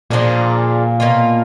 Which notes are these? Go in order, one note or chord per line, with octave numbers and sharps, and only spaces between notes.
A#2 F3 A#3 D4 G#4
B2 A#3 F4